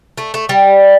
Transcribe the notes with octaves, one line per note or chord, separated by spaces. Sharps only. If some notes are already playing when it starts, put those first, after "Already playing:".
A3
A3
G3